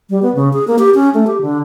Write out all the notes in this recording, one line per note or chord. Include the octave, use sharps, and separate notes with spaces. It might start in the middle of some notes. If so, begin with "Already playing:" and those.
G3
B3
C#3
G#4
A#3
G4
C#4
A3
G4
D3